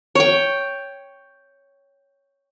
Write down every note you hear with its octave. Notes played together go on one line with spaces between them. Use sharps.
C#5 G5